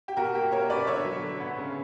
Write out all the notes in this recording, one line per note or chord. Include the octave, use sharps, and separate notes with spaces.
G4
B2 F#4 A#4
A#3 G4
A#3 A#4 C#5
B2 B4 D5
D3 C#5 E5
F#3
D3
B3
C#3